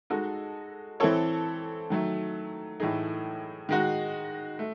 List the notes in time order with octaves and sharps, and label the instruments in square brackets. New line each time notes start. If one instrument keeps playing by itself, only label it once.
[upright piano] G#3 D#4 F#4 A4
E3 C4 E4 A4 C#5
D#3 F#3 A3
A2 E3 A3 D#4 G#4
D#3 G#3 D#4 F#4
A3